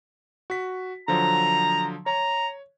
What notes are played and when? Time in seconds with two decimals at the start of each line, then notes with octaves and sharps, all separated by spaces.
0.50 F#4 B6
1.08 D3 F3 F#3 A#5
2.06 C#5 A#5